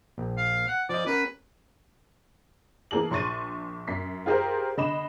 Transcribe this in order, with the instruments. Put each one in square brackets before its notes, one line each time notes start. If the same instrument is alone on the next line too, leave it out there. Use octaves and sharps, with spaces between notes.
[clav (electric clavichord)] A#1
[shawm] F5
F#5
[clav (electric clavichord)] F3 D#5 [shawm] D5
[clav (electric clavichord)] C#4 A#4 [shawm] B4
[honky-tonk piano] E3 A#3 G#4 A4 F#7
A#1 C6 C#6 A6 D#7
F#2 B6 C7
F4 G4 G#4 A#4 C5
D3 D#5 B5 E7